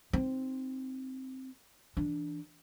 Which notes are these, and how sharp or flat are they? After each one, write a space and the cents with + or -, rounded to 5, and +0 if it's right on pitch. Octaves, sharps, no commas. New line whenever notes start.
C4 +0 D#4 +0
E3 +0 D4 +0